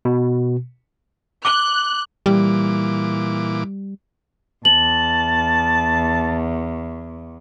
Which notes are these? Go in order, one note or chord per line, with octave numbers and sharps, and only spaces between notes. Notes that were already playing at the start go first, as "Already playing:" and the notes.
B2
D6 F#6 G7
A#2 E3 G3 D6
E2 A5 F#7